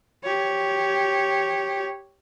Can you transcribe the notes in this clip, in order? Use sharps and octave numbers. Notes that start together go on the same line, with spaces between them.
G4 C#5